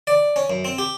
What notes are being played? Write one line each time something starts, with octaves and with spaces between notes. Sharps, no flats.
D5
C#4
F#2
C4
G4